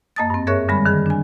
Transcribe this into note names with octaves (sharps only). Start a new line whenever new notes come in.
F#2 A#3 D#5 A5 D#6 A6
G2 C4
G#4 A#4 C#5 E5 C#6 F#6
D3 G3 G#3 B5
D3 D#3 G3 G#4
D4 G#5